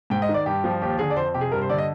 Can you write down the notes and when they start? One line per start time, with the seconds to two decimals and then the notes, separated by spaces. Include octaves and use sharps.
0.10 G#2 G5
0.22 D#5
0.29 D#3
0.34 D5
0.46 G2 G4
0.64 F3
0.81 D#2 G4
0.99 D3 G#4
1.10 D5
1.16 F2 C5
1.34 C3 G4
1.41 G#4
1.52 G2 A#4
1.62 C5
1.69 D3 D5
1.78 D#5